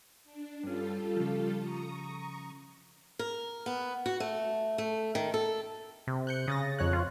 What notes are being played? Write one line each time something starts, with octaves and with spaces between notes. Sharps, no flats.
D4
G2 G3 C#4 F4 A4
C#3 F3
A#5 C#6 D#6
A#4
B3
F#4
A3
A3
D#3
A4
C3
F#6 G6 C#7
C#3 D#6 A6 A#6
F2 C#5 F#6
F4